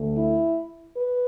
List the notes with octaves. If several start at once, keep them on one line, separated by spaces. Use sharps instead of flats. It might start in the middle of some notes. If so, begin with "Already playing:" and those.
Already playing: D2 D3 A3
E4
B4